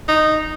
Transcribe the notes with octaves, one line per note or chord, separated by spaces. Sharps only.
D#4